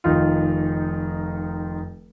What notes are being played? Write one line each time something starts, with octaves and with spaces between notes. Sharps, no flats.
F1 D#3 D#4 F4